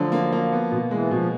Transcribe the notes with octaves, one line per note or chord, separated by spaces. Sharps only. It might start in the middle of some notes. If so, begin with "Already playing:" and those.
Already playing: D3 F3 F#3 A3
A#3
A#3
B3
B2
E3 G#3
B2 F3